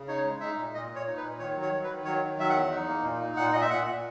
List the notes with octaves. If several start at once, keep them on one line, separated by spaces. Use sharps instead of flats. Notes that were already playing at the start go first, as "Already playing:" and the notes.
Already playing: C#3
D#4 C#5
G#3
D#4 E5
A#2
A#2 D#5
A#2
C#5
D#4
B4
A#2
D#3 C#5
F#3
C#5
F#3
B4
D#3
F#3 C#5
D#3
F#3 E5
E2 F#5
D#4
A#3
A#2
D#4
A#2 F#5
A#2 D#5
E5
A#2 F#5
A#2